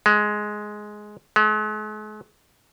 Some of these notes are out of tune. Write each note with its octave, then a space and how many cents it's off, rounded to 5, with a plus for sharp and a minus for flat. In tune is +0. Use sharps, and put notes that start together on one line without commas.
G#3 +10
G#3 +45